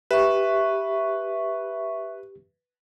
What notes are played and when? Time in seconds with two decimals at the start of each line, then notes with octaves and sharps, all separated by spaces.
0.11 G4 B4 E5 C#6